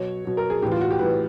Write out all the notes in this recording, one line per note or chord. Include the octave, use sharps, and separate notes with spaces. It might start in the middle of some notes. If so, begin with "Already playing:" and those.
Already playing: B2 F#3 C#5
B2 F#3
A#4
G#4
A2 E3 G4
F4
F#4
G4
A2 E3 B4